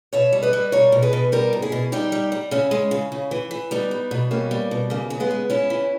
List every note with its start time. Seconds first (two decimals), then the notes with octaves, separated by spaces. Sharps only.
0.13 B2 C#5 E5
0.33 G3
0.43 B4 D#5
0.53 G3
0.72 B2 A#4 C#5
0.92 B2
1.02 G#4 B4
1.13 B2
1.32 G3 G4 A#4
1.53 B2
1.62 E4 G#4
1.72 B2
1.92 G3 D#4 G4
2.12 G3
2.32 G3
2.51 C#3 C#4 E4
2.71 G#3
2.91 C#3
3.12 C#3
3.31 E3
3.51 E3
3.71 G3 B3 D#4
3.91 G3
4.11 B2
4.31 G3 A#3 C#4
4.51 G3
4.71 B2
4.90 C#3 A#3
5.10 C#3
5.20 G#3 B3
5.31 G#3
5.50 C#3 C#4 E4
5.70 E3